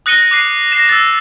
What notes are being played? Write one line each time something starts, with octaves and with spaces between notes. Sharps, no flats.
D#6 F#6 A#6 C#7 D#7 G7
D6 F#6 C7 D#7
A#6 C7 E7
E6 A6